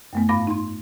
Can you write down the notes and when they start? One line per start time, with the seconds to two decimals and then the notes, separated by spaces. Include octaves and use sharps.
0.13 F#2 A3 B3
0.29 G#2 F5 B5 D6 A#6
0.47 D#4 C6